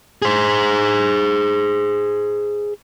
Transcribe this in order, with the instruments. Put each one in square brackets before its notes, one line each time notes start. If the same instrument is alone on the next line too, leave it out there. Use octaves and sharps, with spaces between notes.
[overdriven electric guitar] G#4 C5